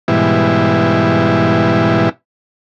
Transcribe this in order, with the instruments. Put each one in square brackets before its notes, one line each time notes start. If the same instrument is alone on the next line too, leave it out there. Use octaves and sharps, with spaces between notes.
[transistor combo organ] G#2 B2 E3 G3 E4